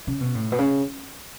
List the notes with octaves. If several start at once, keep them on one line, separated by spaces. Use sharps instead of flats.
C#3
B2
A2
B2
C#3